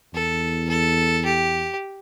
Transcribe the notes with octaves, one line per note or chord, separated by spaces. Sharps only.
E2 A4
A4
G4